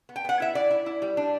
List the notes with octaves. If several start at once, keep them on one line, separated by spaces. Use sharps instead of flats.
B3
G5
B3 F#5
E4 E5
E4 D5
E4
E4
G3
D4